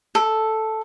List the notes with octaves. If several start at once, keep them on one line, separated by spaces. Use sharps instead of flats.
A4